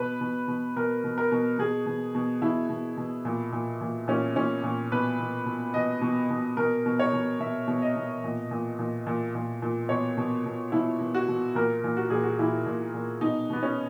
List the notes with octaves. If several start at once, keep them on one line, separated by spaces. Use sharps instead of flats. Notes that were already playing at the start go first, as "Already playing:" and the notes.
Already playing: B2 B4
B2
B2
B2 A#4
B2
A#4
B2
B2 G#4
B2
B2
B2 E4
B2
B2
A#2
A#2
A#2
A#2 C#4
A#2 C#4
A#2
B2 B4
B2
B2
B2 D#5
B2
B2
B2 A#4
B2
C#5
B2
B2 E5
B2
D#5
B2
A#2
A#2
A#2
A#2
A#2
A#2
B2 C#5
B2
B2
B2 E4
B2
F#4
B2
A#2 A#4
A#2
F#4
A#2 G#4
F#4
A#2 E4
A#2
A#2
B2 D#4
B2 B3
C#4